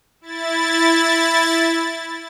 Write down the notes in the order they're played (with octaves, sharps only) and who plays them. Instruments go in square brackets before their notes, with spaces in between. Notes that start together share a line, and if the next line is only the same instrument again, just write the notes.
[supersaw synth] E4 A6